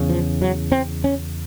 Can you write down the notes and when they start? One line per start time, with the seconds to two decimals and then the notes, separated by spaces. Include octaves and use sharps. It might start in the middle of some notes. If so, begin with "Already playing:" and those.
Already playing: E2 C#3
0.09 F3
0.41 F#3
0.72 C4
1.04 C#4